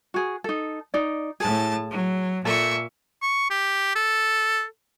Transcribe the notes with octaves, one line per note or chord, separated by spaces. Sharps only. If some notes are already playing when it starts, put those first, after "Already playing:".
F#4 G#4
D#4 A4
D#4 D5
A2 G#4 A5
F#3
A#2 A4 E5 C#6
C#6
G4
A4